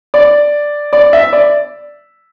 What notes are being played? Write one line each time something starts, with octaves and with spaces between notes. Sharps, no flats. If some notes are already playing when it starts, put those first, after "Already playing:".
D5
D5
E5
D5